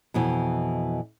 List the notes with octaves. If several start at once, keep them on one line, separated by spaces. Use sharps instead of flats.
F2 B2 E3